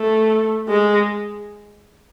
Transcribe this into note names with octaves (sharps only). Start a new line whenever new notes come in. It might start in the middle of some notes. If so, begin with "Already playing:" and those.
Already playing: A3
G#3